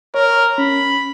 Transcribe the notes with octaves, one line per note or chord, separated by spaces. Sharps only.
A#4 C#5
C#4 B5